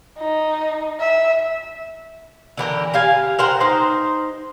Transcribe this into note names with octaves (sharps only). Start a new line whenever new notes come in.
D#4
E5
D3 E3 G4 A#4
G4 F5 G#5
A#4 C5 F#5 G5
D#4 C5